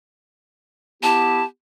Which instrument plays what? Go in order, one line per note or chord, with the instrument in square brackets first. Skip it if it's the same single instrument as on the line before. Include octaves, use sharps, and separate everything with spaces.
[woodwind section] B3 E4 G4 [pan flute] A5